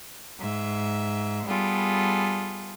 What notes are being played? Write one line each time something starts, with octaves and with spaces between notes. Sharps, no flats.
G#2 E5
G3 B3 F4 G#4 A4